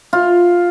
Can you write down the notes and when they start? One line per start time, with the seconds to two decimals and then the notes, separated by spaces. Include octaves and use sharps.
0.13 F4